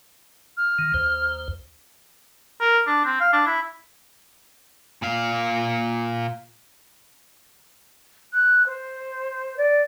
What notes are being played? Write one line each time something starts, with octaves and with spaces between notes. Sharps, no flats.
F6
D#3
D#2 C5
A#4
D4
C4
F5
D4
E4
A#2 F5
F#6
C5
D5